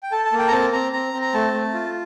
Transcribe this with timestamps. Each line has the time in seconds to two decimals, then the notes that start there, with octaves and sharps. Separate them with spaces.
0.03 G5
0.12 A4 A5
0.25 A5
0.33 A#3
0.39 G5
0.48 A#5
0.52 C4 A5
0.73 C4 A#5
0.93 C4 A#5
1.13 C4
1.22 A#5
1.34 A3 A5
1.54 A3
1.74 F4